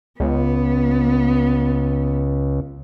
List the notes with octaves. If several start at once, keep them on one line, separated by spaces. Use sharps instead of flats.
C#2 B3